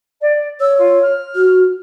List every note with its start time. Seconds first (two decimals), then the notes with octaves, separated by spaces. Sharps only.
0.21 D5
0.60 C#5 E6
0.78 F4
1.02 F6
1.36 F#4